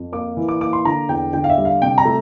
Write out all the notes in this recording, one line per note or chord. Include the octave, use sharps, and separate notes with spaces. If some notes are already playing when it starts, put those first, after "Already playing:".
Already playing: F2
A#3 D6
E3
D6
A#3 D6
C6
D3 A#5
E2 G5
D3 G5
F5
E5
G3
F5
C3 G5
A#5
A3